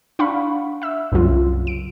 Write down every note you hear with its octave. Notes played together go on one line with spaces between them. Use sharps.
D4 F5 F#5 B5 C#6
E5 E6
C2 F#2 C#3 F#3 F4
D7